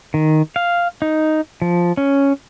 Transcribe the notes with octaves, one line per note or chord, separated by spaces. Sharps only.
D#3
F5
D#4
F3
C#4